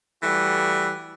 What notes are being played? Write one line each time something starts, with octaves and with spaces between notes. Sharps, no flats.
E3 G3 A3 F#4